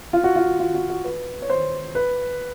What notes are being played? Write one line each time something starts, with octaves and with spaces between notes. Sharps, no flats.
F4
F#4
F4
F4
F#4
F#4
B4
C#5
C5
B4